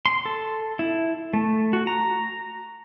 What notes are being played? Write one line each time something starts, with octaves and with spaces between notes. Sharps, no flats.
C6
A4
E4
A3
F#4
A#5